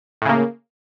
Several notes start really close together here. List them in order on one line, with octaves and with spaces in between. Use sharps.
A2 C#3 A#3